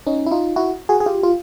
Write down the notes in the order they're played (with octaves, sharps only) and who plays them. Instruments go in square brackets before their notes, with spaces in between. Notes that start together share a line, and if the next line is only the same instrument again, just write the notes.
[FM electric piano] C#4 D#4
E4
D#4 F4
E4 F#4
F#4 G#4
G#4
F4 G4
F4